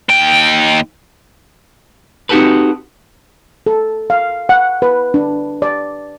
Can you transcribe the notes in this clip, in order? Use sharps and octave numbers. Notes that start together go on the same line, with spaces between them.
D#2 G5
C4 D#4 F#4 G4 A4 B4
A4
F5
F#5
B4
D4
D5